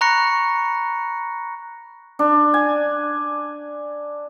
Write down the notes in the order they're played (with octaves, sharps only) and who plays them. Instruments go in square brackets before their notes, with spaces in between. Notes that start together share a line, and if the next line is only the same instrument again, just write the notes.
[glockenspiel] A#5 B5 C#6 F#6 A#6 C#7
[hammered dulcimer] D4
G#5